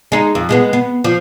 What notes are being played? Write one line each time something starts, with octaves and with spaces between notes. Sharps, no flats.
G#3 D#4
F2
G#3 A3 B3
B3
F3